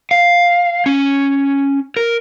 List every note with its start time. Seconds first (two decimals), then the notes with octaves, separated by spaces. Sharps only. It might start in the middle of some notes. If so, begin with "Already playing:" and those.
0.11 F5
0.86 C#4
1.97 A#4